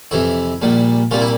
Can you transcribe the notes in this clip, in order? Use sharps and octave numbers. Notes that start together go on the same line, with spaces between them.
F2 C3 E3 E4
A#1 A#2 G3
C2 A#2 G3 A#3 F4
E4